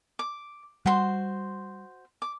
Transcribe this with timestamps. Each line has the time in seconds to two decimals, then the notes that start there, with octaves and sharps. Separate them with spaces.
0.19 D6
0.86 G3 F#4 C5 C6
2.22 D6